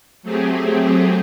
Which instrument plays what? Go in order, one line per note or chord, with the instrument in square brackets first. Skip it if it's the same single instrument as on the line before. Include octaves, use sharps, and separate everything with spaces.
[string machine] F#3 A3 C4 G4 G#4